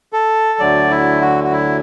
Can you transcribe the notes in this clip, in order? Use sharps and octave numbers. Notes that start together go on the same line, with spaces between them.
A4
D2 D3 F#3 D5
E4
F#4
F#4
E4